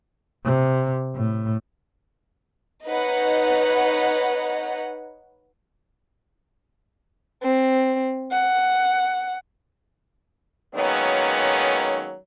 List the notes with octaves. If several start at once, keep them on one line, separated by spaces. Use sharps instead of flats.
C3
A2
D#4 B4 C#5 D#5 F#5
C4
F#5
D#3 F#3 G#3 A#3 B3 C#4